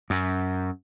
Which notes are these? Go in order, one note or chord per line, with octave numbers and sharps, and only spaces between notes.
F#2